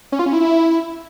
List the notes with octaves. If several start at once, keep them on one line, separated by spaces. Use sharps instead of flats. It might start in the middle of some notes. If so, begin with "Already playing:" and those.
C#4
F4
C#4
E4